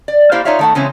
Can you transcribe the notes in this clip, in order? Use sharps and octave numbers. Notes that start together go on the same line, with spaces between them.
D5
A#3 E4 G4 C5 D5 F5
D#4 F4 C#5 D5 E5 F5
D#3 A3 F#5
C#3 E3 G#3 C4 C#4 E4